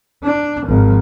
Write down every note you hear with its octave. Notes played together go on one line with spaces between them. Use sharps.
D4
G#1 F3